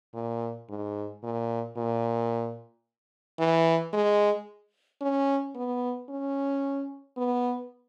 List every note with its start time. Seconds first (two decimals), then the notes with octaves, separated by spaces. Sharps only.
0.14 A#2
0.69 G#2
1.23 A#2
1.77 A#2
3.39 E3
3.93 G#3
5.01 C#4
5.55 B3
6.09 C#4
7.17 B3